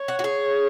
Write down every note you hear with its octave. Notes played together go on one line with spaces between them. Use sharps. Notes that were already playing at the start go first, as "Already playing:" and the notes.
Already playing: C#5
F#4
F#4
G#4